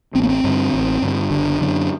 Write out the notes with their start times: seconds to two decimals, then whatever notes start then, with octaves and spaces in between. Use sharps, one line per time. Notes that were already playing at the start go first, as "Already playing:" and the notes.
0.15 A1 C4
0.23 A#3
0.29 C4
0.44 G2 D3
0.74 A1
1.02 G2 D3
1.30 F#1 D3
1.60 F#2 D3